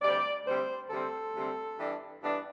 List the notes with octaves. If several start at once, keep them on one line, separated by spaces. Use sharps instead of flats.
D2 C3 G3 C4 D5
D2 C3 G3 C4 C5
D2 C3 G3 C4 A4
D2 C3 G3 C4
G2 E3 B3 D4
G2 E3 B3 D4